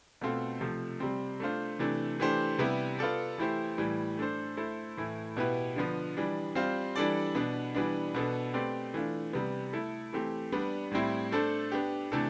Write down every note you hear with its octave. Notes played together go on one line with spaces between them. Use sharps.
B2 A3 C4 F4 A4
C3 F3 A3
C3 G3 C4
A3 D4 F4 C5
C3 E3 A3 D4
E3 A3 D4 G4 C5
C3 G3 B3 E4 G4
B3 F4 A4 D5
E3 A3 E4 G4 C5
A2 E3 G3
A3 D4 A4 C5
A3 E4 A4 C5
A2 E3 A3 E4
B2 B3 E4 G4 B4
D3 F3 B3
E3 G3 D4
G3 C4 F4 C5
E3 G3 D4 A4 D5
B2 B3 D4
E3 G3 B3 D4
B2 B3 D4 A4
A3 C4 G4 B4 D5
E3 A3 D4 F4
C3 G3 B3
A3 E4 A4
E3 A3 C4 G4
G3 B3 D4
A2 G3 C4 E4
A3 D4 A4 C5
B3 D4 G4
C3 E3 A3 D4 A4